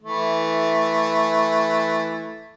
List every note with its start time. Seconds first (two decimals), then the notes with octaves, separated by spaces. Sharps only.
0.02 E3 A3